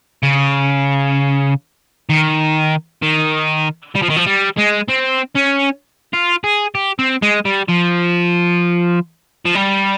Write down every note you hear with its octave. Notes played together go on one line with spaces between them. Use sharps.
C#3
D#3
D#3
G3
F3
D#3
F3
G3
G#3
C4
C#4
F4
G#4
G4
C4
G#3
G3
F3
F3
G3